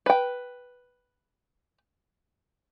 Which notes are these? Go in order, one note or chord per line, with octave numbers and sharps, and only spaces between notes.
B4 G5